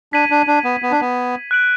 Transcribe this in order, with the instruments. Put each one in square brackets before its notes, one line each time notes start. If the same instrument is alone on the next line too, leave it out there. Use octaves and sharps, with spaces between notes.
[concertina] D4 [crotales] G#6 B6 D#7 F#7
[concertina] D4
D4
B3
B3
D4
B3
[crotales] F#6 D7 F#7